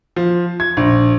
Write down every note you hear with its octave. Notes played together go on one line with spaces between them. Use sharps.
F3
G#6
A#1